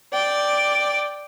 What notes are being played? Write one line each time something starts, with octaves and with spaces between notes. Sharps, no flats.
D5 G5